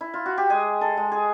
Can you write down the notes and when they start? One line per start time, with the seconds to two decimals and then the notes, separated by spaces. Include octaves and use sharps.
0.01 E4
0.14 F4
0.26 F#4
0.38 G4
0.50 G#3 G#4
0.81 A4
0.97 G#3
1.12 G#4